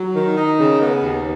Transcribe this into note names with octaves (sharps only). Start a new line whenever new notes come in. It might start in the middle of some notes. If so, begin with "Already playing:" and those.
Already playing: F#3
D#3
D#4
C#3
B3
D#2